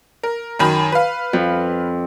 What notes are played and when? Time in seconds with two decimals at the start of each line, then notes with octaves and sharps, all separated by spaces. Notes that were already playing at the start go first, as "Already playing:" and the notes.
0.23 A#4
0.59 F#2 D#3 B5
0.92 B4 F5
1.33 F2